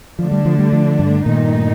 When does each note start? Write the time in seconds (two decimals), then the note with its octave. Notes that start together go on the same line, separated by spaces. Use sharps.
0.19 D3 F3 A3 D4
0.32 G3
0.45 F3
0.59 G3
0.73 F3
0.99 G2
1.26 G2 A#2 D#3 A3 D#4